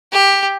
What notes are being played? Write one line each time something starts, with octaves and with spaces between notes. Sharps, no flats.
G4